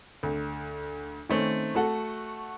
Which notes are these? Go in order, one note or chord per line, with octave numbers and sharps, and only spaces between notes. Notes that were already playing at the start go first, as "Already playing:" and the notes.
D2
D#3 A3 C4 C#4
A3 F#4 A4 F#5